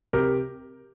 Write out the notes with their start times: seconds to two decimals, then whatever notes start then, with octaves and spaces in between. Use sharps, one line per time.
0.13 C3 G4 A#4